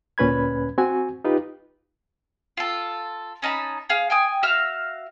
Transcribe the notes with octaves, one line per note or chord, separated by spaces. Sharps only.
D2 A#2 C#4 B4 B5 G#6
C4 F#4 G#5
D#4 F4 G4 B4
F4 A4
C#4 D#4 A5 B5
G#4 F5
G5 G#5 D#6
F#4 E5 F5 F6